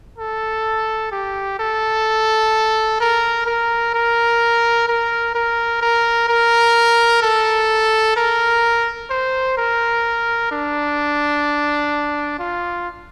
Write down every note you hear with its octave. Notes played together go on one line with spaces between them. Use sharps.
A4
G4
A4
A#4
A#4
A#4
A#4
A#4
A#4
A#4
A4
A#4
C5
A#4
D4
F4